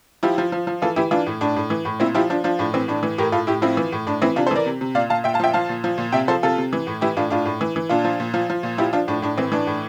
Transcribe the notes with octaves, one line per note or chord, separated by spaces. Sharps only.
F3 E4 G4
F3
F3
F3
E3 F4 A4
E3 E4 G4
E3 D4 F4
A2
A2 D4
A2
E3
A2
A#2 C4 E4
F3 E4 G4
F3 D4
F3 D4
A2 D4
E3 C4
A2 D4
E3
A2 G4 A#4
A2 F4 A4
A2 E4 G4
F3 C4 E4
E3
A2
A2 D4
E3 C4 E4
C3 D4 F4
A4 C5
E3 A#4 D5
C3
C3
A#2 D5 F5
A#2 F5 A5
A#2 E5 G5
F5 A5
F3 E5 G5
F3 F5 A5
A#2
F3
A#2
C3 E5 G5
F3 A4 C5
C3 F4 A4
C3
E3
A2
E3 E4 G4
A2 D4 F4
A2 D4 F4
A2
E3
E3
A#2 D4 F4
F3
A#2
F3
F3
A#2
F3 E4 G4
F3 D4 F4
A2 D4
A2 D4
E3 C4
E3 D4
A2